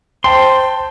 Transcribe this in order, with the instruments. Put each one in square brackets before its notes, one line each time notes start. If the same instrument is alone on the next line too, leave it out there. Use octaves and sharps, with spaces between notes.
[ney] C5 [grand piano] G5 A5 [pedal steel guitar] C6